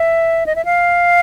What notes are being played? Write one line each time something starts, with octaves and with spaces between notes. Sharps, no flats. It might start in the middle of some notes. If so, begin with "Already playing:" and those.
Already playing: E5
D#5
E5
F5